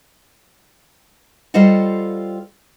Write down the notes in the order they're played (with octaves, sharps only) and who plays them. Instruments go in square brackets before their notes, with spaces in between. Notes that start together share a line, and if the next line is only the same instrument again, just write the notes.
[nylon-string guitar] G3 F4 A4 C5 D#5 F#5